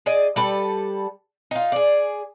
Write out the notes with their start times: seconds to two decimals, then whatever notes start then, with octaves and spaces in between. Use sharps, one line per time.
0.06 G#4 D5 D#5
0.36 G3 A4 B4
1.51 D#4 F4
1.72 G#4 D5